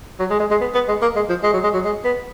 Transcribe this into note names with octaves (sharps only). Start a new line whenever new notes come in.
F#3
G#3
G#3
G#3
B3
B3
G#3
A#3
G#3
F3
G#3
F#3
G#3
F#3
G#3
B3